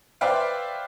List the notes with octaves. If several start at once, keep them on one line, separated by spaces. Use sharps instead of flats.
B4 C5 D5 E5 F5 G5